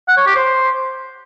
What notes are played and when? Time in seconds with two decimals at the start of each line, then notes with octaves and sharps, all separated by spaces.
0.08 F#5
0.17 C#5
0.26 G4
0.35 C5